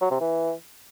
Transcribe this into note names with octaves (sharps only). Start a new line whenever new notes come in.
F#3
C3
E3